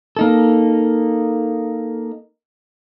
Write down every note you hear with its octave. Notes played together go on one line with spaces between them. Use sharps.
A#3 D#4 A4